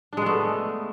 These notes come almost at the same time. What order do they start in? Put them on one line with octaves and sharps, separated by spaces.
D4 G#3 B3 A3